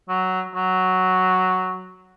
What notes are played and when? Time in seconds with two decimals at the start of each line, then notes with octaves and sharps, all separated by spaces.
0.08 F#3
0.55 F#3